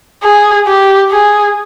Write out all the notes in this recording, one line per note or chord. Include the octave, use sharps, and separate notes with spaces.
G#4
G4
G#4